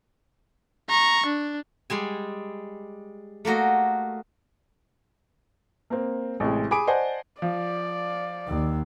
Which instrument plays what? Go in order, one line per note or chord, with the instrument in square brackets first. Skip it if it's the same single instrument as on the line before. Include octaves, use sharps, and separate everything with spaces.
[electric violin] A#5 C#6
D4
[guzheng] G3 G#3 G#5
A3 A#3 F#4 D#5
[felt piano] A#3 C4
A1 C3 G#3
G#4 G#5 B5 D6 D#6 D7
C5 D5 D#5 F#5 G#5 A5
[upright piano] F3 [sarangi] D5
[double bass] D#2